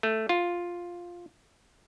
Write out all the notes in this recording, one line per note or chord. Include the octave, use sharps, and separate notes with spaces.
A3
F4